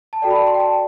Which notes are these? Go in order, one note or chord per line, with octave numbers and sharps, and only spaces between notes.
A5
F#4 A4 D5 G5
B5
A5
C6
G5
A5